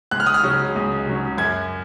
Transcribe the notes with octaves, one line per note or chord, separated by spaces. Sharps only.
C#2 F#6
F6
D#6
F6
C#3 F#3 C#4
C#2
C#3 F#3 C#4
F#2 G#6